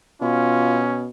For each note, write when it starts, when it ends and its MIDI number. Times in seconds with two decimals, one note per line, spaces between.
0.22 1.09 47
0.22 1.08 61
0.22 0.83 65